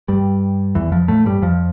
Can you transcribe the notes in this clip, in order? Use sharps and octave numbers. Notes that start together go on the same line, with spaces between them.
G2 G3
E2 E3
F2 F3
A2 A3
G2 G3
F2 F3